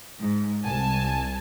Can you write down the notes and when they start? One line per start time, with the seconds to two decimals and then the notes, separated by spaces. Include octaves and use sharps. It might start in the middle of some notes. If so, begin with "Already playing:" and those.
0.20 G#2
0.64 C2 G#5 A5